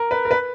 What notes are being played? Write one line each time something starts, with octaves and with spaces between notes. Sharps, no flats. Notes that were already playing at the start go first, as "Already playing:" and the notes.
Already playing: A#4
B4
A#4
B4